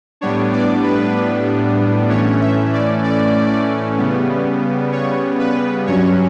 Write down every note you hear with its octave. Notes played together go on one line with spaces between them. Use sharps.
A2 G3 B3 D4 C#5
D5
B4
A2 E3 A3 C#4 C#5
E5
D5
D5
C#3 G3 B3
C#5
B4
G2 F#3 C#4 C#5